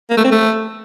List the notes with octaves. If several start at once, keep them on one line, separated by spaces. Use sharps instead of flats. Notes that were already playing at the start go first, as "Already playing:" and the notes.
A#3
A3
C4
A3